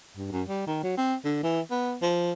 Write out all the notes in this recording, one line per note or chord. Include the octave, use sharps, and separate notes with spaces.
G2
F#2
G3
D#3
F#3
C4
D3
E3
B3
F3